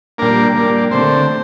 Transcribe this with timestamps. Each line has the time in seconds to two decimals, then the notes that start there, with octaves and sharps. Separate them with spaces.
0.18 A#2 G3 A#3 D4 A#4
0.55 A#2 G3 A#3 D4
0.91 D3 A3 C4 C5